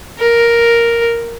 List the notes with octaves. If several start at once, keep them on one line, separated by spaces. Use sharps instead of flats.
A#4